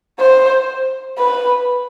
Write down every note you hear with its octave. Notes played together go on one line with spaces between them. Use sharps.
C5
B4